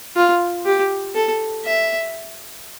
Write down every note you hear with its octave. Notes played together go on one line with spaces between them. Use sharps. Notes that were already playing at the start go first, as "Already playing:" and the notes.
F4
G4
A4
E5